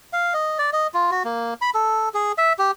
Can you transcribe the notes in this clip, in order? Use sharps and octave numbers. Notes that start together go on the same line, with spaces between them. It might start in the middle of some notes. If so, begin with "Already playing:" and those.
F5
D#5
D5
D#5
F4
F#4
A#3
B5
A4
G#4
E5
G4